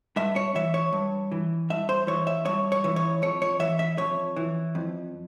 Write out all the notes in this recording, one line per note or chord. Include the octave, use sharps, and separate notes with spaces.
G2 E5
C#5
E3 E5
C#5
G2
E3
G2 E5
C5
E3 C#5
E5
G2 C#5
C#5
E3
C#5
F2 C#5
C#5
E3 E5
E5
F2 C#5
E3
F2